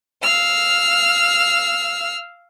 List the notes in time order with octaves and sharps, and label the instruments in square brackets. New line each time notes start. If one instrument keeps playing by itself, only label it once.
[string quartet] F5 E6 F6